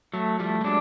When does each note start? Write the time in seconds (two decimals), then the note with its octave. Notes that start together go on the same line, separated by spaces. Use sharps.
0.14 F#3 A3
0.39 F3 G3 A3
0.61 G3
0.64 F#3 G#3 D4